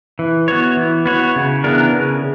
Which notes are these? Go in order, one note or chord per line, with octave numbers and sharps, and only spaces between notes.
E3
B3 F#4 C#5
E3
B3 F#4 C#5
C#3
E3 B3 D4 A#4
C#3